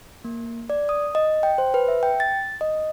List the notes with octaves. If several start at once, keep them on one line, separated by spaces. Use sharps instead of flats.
A#3
D5
D#6
D#5
G5
C5
B4
E5
G5
A6
D#5